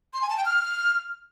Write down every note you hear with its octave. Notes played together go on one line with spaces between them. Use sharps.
C6
G#5
A5
G5
F6